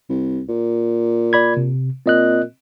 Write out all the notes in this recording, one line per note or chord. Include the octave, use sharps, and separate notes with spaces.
C2
A#2
D5 B5 G#6
C3
A#2 C4 D#5 F#6